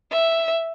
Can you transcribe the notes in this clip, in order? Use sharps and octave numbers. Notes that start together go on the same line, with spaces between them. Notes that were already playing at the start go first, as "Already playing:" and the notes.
E5